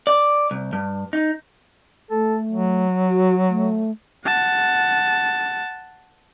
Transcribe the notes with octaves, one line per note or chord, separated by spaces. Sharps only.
D5
C2
G2
D#4
A3 A4
F#3
F#4
A3
F#5 A5